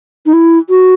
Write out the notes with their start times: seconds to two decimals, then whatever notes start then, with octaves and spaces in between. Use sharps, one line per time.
0.26 D#4
0.33 E4
0.70 F#4